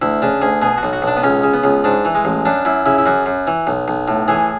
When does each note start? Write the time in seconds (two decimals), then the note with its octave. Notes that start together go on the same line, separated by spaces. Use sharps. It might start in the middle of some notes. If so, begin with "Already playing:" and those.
0.02 D2 E4
0.22 C#3 D4
0.42 D2 G#4
0.62 B2 G#4
0.78 F#4
0.83 B1
0.93 F#4
1.02 B1
1.07 D4
1.17 B3
1.23 C#2 C#4
1.43 C#3
1.53 B3
1.64 C#2
1.84 G#2 D4
2.05 E3
2.15 G#3
2.25 A1
2.45 F#2 D4
2.65 F#2 E4
2.86 C#3 E4
2.98 E4
3.06 F#2 F#4
3.26 F#2
3.47 E3
3.67 B1
3.88 B1
4.08 A2
4.28 E3 G#4